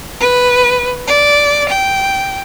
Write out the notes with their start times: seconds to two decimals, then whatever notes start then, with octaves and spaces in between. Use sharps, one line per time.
0.21 B4
1.07 D5
1.69 G5